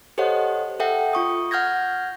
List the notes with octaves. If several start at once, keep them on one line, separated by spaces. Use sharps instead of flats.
G4 A4 C5 C#5 D#5 F#5
A4 E5 F#5 G5
F4 C#6 D#6
F#5 F6 G6 G#6 A#6